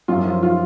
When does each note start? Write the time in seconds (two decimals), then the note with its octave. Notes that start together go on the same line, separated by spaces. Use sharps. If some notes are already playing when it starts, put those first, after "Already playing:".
0.08 F#2 F4
0.25 F3 F4
0.43 F4